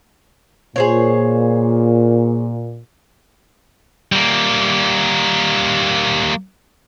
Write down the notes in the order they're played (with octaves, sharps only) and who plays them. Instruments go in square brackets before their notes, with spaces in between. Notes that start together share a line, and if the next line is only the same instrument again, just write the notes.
[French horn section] A#2 [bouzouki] G#4 C5 C#5
[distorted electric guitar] G3 A#3